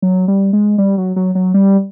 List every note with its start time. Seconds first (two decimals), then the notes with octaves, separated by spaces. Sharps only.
0.02 F#3
0.28 G3
0.53 G#3
0.78 G3
0.98 F#3
1.16 F#3
1.35 F#3
1.54 G3